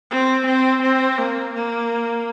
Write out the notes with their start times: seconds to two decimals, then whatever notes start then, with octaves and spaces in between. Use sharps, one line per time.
0.11 C4
0.46 C4
0.82 C4
1.18 A#3
1.54 A#3